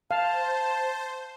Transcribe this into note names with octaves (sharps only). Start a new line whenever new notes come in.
C5 F5 A5